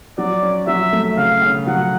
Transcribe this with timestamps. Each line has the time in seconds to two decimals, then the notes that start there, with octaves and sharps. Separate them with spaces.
0.18 F#3 D5
0.43 C#4
0.67 F#3 E5
0.92 A3
1.17 C#3 F5
1.42 C#3
1.67 F#3 F#5